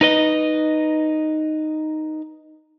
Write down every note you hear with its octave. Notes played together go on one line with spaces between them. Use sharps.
D#4 B4 D#5